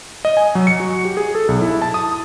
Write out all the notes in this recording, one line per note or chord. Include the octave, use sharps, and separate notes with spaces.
D#5
G#5
F#3
C#7
F#4
G4
G#4
A4
B1
E4
A5
D#6